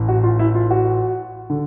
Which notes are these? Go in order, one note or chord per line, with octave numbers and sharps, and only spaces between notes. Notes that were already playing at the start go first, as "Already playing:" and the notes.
Already playing: A1 E3
F#4
F4
E4
F4
F#4
D3